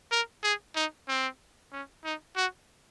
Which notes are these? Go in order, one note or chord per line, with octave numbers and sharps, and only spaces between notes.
A#4
G#4
D#4
C4
C#4
D#4
F#4